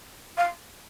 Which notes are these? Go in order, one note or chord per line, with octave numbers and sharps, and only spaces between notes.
F5